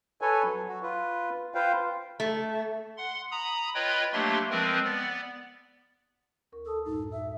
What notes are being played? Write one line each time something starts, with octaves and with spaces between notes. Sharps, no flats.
A4 B4 C#5 G#5
F#3
F#4
F4 B4
F4 B4 C5 F5 G5
A3
F#5 C6
A#5 B5 D#6
F4 B4 C#5 D#5 G5 B5
F#3 A3 A#3 D4 G4 C6
F3 G#3 C4 A#4 B4
B3 D5
D2 A#4 C#6
A4 A5 D#6 E6
F#2 A2 G#3 D#4
E5 E6